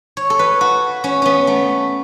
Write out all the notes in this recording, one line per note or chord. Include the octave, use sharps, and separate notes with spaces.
C#5
A4
B4
F#4
C#4
B3 C#4
A3